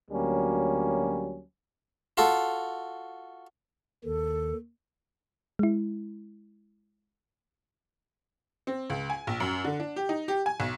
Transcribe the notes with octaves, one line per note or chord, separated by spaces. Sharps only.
D2 F#3 G3 A#3 C#4
F4 F#4 A4
D#2 D#3 A4
G#3 E4
C4
C#2
G#5
A#1
F#2
D3
D4
G4
D#4
G4
G#5
B1